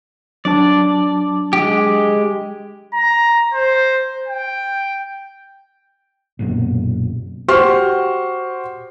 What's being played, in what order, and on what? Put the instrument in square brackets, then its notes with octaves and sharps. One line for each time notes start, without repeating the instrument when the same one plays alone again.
[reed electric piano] F#3 D4 A5 [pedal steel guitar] D5
[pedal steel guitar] G#3 G4
[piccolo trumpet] A#5
C5
G5
[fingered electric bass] B1 F#2 A#2
[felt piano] F#4 G4 C5 C6 F6